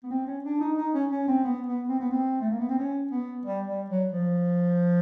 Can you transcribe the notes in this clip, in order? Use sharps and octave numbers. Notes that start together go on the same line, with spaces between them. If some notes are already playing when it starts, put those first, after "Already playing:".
B3
C4
C#4
D4
D#4
D#4
C#4
C#4
C4
B3
B3
C4
B3
C4
A3
A#3
B3
C4
C#4
B3
G3
G3
F#3
F3